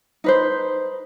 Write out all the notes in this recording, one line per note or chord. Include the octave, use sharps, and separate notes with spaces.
D#4 B4 C5